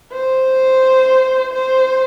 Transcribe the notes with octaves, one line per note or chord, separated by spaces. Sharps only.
C5
C5